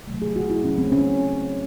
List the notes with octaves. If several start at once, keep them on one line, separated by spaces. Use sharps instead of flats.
C3 F#3 A3
G#4
F#4
E4
C3 F#3 A3 C#4
C4
C#4